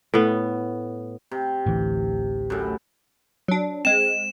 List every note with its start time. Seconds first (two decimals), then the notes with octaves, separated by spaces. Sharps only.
0.14 A2 B3
1.31 C3
1.66 A1 D2 E3
2.50 F#2 A2
3.48 F#3 D4
3.85 G#3 C4 E7